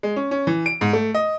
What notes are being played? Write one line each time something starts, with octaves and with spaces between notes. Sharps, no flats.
G#3
C#4
C#4
E3
D7
G#2
A3
D#5